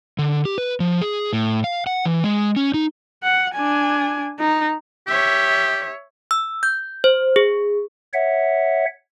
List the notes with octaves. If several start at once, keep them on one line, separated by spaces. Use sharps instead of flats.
D3
G4
B4
F3
G#4
A2
F5
F#5
E3
G#3
C#4
D#4
F#5
D4 G#5
D#4
G4 C#5 E5
E6
G6
C5
G#4
C#5 E5 F#5